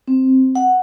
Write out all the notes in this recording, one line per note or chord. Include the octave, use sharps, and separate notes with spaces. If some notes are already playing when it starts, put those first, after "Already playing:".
C4
F#5